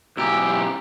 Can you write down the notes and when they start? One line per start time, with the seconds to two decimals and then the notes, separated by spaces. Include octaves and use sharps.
0.17 B1 G4 G#5 A#5 E6